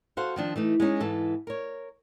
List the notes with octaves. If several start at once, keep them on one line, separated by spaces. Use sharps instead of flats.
F#4 A4 C5 F5 F#5
D#3 F3 D4
E3 A3 D#4
G#3 B3 C#4 D#4
G#2 E3 A4
A#4 C#5